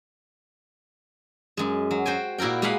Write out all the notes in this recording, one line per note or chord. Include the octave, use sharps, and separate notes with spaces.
F#2 G#3
F#3
F#4 C5 G5 G#5
A#2 E4 F#4 A#4 G5
G#3 A#3 B4 F5 F#5 B5